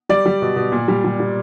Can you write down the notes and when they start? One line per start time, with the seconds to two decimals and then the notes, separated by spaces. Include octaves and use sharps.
0.09 G3 D5
0.26 G3
0.42 B2
0.56 B2
0.72 A#2
0.88 G3
1.04 G3
1.20 G3